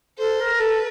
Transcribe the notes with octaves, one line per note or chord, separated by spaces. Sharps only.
A4 C5
A#4
A4 B4